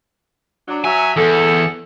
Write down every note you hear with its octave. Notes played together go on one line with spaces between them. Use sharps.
F#3 D4
F#3 E5 G#5
E2 F#4 G#4 A4